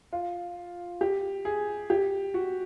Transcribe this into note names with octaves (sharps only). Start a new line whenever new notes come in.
F4
G4
G#4
G4
F#4